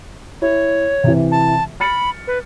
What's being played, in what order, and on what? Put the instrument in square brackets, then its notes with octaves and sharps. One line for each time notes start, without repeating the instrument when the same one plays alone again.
[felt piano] E4 [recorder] C#5
[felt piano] C3 E3
[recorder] A5
[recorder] B5 [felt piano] F6 A6 C#7
[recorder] B4